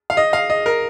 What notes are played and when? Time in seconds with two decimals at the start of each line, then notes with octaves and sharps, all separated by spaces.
0.10 F5
0.17 D#5
0.33 F5
0.50 D#5
0.66 A#4